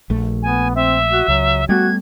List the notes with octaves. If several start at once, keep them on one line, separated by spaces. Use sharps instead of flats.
A#1 A3
B3 G#5
C4 E5
F#4
C#2 F#3
G3 A3 B3 F#4 G#6